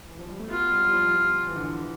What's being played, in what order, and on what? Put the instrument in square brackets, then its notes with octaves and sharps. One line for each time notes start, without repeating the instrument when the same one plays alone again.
[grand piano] E3
F3
G3
A3
[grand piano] B3 [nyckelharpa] F4
[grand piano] G3
G3
F3
G3
F3
E3
D3
E3
E3